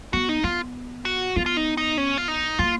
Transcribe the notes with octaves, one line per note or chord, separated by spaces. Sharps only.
B3 F#4
D#4
B3 F4
F#4
B3 F4
F4
D#4
D#4
C#4
F4
D#4
A#3 F4